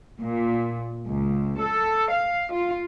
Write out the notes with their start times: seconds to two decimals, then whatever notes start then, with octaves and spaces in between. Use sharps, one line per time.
0.22 A#2
1.09 C#2
1.60 A4
2.10 F5
2.52 F4